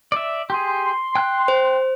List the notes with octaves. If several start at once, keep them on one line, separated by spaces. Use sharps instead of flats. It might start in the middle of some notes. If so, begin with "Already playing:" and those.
D5 E5
G4 G#4 C6
G5 F#6
C5